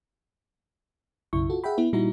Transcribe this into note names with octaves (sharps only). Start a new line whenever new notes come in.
B1 F#2 C#3 E4 C#6
F4 F#4 A4
G#4 E5 F#5 G5 B5
B3 E4 B4
A#2 G3 D#4 E4 F#4 A#5